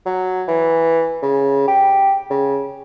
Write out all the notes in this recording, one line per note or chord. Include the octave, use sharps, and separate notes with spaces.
F#3
E3
C#3
G4
C#3